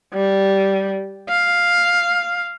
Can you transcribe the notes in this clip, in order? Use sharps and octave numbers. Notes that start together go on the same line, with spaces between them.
G3
F5